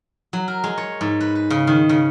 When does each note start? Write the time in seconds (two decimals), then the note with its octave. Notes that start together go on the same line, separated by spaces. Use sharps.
0.33 F#3
0.48 A#4
0.64 G#3
0.78 C#5
1.01 G#2
1.21 B4
1.35 B4
1.50 C#3
1.67 D#3
1.89 C#3